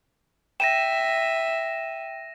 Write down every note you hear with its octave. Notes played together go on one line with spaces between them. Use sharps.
E5 G5 A#6 D#7 E7